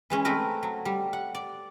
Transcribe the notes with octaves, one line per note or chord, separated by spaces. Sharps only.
E3 G#3 C#4
A3 C4 D#4 A#4 B4
F#3
G3
F#5
D5